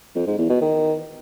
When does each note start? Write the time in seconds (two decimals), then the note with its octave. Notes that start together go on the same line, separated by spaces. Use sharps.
0.15 F2
0.27 G#2
0.38 E2
0.50 B2
0.61 D#3